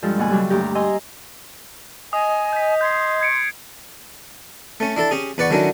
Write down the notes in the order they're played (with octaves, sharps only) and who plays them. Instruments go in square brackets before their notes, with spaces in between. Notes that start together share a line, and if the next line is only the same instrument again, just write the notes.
[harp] G2 F3 G#3 F4 A4
D#2 B2 F3 F#5 G#5
C#3 F#3 G3 G4 A4
D2 G2 G4 A#5
D#5 G#5 A#5 C6 E6
[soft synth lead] D#5 [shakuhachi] G#5 [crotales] D#6
[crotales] G6 B6
[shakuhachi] C6 [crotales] G6 G#6 C7
[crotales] G#6 C#7 D7
[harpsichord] A3 C#4
D4 E4 A4 A5
C#4 G4 G#4
E2 B4 D5 F#5 C#6
D3 D#3 F#3 C#4 D4 E4